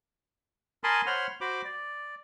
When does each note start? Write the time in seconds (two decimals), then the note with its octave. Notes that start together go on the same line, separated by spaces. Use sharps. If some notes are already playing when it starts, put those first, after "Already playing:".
0.84 A#4 G#5 A5 B5 C6 D#6
1.06 C5 C#5 F#5 B5 C6 F6
1.41 F#4 C5 B5 D6
1.64 D5